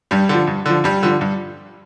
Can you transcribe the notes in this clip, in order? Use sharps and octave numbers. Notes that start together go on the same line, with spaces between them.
G2 G3
D3 F3
G2
D3 F3
G2 G3
D3 F3
G2